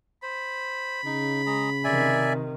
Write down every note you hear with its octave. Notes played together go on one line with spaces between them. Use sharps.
C5 B5
C#3 D#4
G#3 G#4 A#5
C3 D#3 D5 E5 G#5